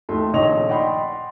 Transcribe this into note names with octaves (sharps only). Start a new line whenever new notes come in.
D#2 A3 C6
A#1 D#3 C#5 D#5 C#6 F7
D5 D#5 F#5 G5 B5 C6